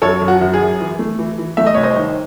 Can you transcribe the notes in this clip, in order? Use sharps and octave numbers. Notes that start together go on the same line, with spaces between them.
F#2 A4 C#5
F#2
F#4
F#2
G#4
F#2
E3
A3
E3
E3
A3 E5
D#5
C2 C#5
C5 D#5
D#3